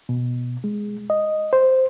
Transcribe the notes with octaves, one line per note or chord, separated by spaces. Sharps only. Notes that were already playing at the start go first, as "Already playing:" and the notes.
B2
G#3
D#5
C5